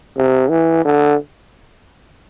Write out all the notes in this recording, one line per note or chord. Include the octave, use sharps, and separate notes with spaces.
C3
E3
D3